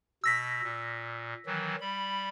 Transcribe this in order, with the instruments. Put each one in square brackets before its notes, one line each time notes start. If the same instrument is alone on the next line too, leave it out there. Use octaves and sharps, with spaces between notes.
[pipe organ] B2 [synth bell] E6 A#6 B6
[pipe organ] A#2
D#3 E3 F#3
G3 B5